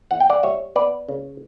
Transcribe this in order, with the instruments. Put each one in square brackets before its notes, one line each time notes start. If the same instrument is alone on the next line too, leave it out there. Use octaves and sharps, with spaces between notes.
[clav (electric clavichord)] E2 F#5
G5
D5 F#5
G3 C#5 E5
B3 B4 D5
C#3